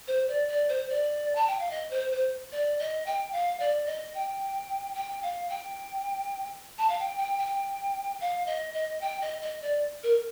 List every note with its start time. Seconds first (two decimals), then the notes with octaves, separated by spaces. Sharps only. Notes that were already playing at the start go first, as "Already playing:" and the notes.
0.08 C5
0.28 D5
0.48 D5
0.69 C5
0.89 D5
1.35 A5
1.47 G5
1.59 F5
1.71 D#5
1.91 C5
2.11 C5
2.52 D5
2.79 D#5
3.06 G5
3.33 F5
3.60 D5
3.86 D#5
4.14 G5
4.95 G5
5.23 F5
5.50 G5
6.78 A5
6.89 F5
6.99 G5
7.18 G5
7.38 G5
8.21 F5
8.47 D#5
8.74 D#5
9.01 G5
9.21 D#5
9.41 D#5
9.62 D5
10.03 A#4